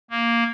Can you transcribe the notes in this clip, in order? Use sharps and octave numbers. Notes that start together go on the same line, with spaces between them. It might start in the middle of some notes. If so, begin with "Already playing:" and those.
A#3